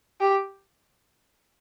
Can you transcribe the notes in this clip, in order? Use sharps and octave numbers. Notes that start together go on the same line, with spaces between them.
G4